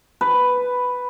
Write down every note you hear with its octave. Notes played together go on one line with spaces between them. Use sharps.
B4